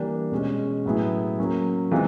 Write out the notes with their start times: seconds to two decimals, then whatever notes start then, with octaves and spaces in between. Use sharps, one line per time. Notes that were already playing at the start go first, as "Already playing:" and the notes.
Already playing: E3 G3 A#3 D4 G4
0.32 B2 G#3 C#4
0.85 A2 F#3 B3 E4 G#4
1.39 F#3 A#3 C#4
1.91 C3 E3 G#3 C4 F4